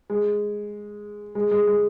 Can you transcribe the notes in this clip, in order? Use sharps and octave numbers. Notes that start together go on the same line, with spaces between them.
G#3
G#3
G#3
G#3